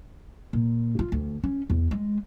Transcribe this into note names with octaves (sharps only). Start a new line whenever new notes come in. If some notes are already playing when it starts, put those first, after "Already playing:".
A#2
F4
D2
C#4
E2
G#3